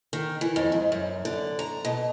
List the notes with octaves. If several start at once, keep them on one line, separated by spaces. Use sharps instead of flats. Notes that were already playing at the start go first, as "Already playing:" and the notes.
D#3
E3
F2
G#2
F#2
D3
A#5
B2